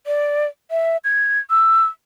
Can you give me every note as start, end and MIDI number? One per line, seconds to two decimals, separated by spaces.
0.06 0.46 74
0.71 0.97 76
1.04 1.39 92
1.50 1.85 88